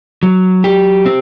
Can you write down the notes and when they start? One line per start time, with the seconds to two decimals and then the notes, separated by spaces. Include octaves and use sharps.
0.23 F#3
0.64 G4
1.06 C4